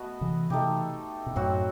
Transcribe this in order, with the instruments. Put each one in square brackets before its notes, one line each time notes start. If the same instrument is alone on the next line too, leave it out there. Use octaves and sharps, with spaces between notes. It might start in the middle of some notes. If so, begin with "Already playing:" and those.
Already playing: [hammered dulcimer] A3 B3 F#4 B4 D#5
[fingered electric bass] C3 E3
[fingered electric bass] C3 E3 [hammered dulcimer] A3 D#4 G4
[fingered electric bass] B2
[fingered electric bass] F#2 A2 [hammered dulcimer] F#3 C4 F#4